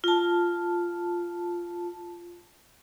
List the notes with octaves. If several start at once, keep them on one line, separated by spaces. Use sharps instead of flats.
F4 A5